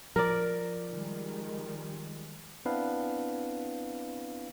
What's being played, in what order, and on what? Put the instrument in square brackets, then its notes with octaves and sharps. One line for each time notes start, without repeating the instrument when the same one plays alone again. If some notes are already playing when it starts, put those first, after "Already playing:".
[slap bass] F3 [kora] A#4 D5
[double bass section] D#3 G3 G#3
[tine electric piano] B3 C4 D4 E4 B4 F5